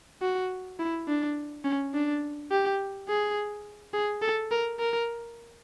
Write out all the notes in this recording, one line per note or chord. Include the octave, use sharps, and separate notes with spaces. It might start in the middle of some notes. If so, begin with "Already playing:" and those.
F#4
E4
D4
C#4
D4
G4
G#4
G#4
A4
A#4
A#4